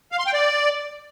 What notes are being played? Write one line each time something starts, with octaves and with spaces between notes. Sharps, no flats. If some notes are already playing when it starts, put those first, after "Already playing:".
F5
C6
G5
D5